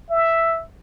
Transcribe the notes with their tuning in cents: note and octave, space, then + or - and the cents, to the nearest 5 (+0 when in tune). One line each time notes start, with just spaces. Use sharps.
E5 +5